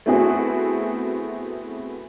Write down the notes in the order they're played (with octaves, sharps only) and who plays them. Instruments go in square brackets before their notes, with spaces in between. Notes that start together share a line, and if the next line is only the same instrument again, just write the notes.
[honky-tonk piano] A3 B3 C4 E4 F#4 G#4